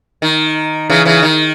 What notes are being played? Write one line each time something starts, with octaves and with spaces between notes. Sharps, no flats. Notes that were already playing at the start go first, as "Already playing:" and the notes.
D#3
C#3 E3
C#3 E3
D#3